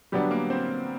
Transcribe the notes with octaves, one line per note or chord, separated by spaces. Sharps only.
D3 F#3 G3 B3 D4 G4
A#3 A#4
C4 C5